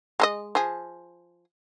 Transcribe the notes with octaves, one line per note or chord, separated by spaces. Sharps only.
G#3 A4 D#5
F3 G#4